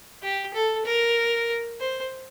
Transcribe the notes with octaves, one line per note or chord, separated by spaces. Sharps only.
G4
A4
A#4
C5